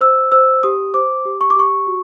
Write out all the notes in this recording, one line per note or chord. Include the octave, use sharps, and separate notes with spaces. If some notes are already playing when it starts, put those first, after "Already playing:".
C5 E6
C5 E6
G4 D#6
C5 D6
G4
C#6
D6
G4 C#6
F#4